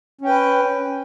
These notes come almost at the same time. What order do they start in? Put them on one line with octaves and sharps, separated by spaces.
C#4 G5 B4